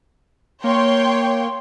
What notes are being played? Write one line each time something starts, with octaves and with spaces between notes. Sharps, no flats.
A#3 C#5 G5 C6